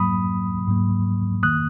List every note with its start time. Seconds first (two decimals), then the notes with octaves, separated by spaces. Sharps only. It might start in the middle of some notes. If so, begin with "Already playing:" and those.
Already playing: G#2 F#3 A#3 B5 D#6
0.68 G#2 F#3 A#3
1.43 D#3 A#3 D#6 F#6